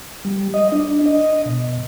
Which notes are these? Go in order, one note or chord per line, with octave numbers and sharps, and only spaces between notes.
G3
D#5
D4
D#5
B2